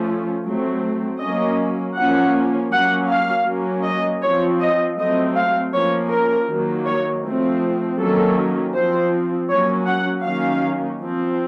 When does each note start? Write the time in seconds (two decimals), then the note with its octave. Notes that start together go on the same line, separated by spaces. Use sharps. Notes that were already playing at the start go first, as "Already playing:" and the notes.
Already playing: F3 A3 C#4
0.46 F#3 A3 C4
1.21 F#3 A#3 C#4 D#5
1.96 F3 A#3 C#4 F#5
2.72 F#3 A#3 C#4 F#5
3.10 F5
3.47 F#3 A#3 C#4
3.85 D#5
4.22 F3 C4 C#5
4.60 D#5
4.97 F#3 A3 C4 D#5
5.36 F5
5.73 F3 A#3 C#4 C#5
6.11 A#4
6.49 D#3 F#3 A#3
6.86 C#5
7.24 F3 A3 C4
7.99 D#3 F#3 A#3 C#4 A4
8.75 F3 C4 C5
9.50 F#3 A#3 C#4 C#5
9.88 F#5
10.25 D#3 F#3 A#3 C#4 F5
11.01 F3 C4